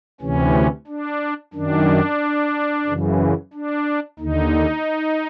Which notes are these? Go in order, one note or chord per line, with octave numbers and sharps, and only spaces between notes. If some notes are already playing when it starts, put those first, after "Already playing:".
D2 C3 E3 C#4
D4
F#2 D#3 D4
F#2 C#3 E3
D4
D#2 D3 D#4